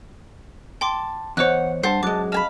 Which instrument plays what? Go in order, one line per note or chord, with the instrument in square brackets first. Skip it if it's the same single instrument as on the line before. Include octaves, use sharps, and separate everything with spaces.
[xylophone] G5 C6 D6 [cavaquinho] A5
[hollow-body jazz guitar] E2 C#5 [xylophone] C5 D#5 F#6 [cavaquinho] F#5
[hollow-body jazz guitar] G2 [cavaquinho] C5 A5 [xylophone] F#5
[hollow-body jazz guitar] F#2 G#3 [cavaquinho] A5 [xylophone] D6 F#6
[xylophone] D#5 A5 [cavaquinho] F5 G#5 B5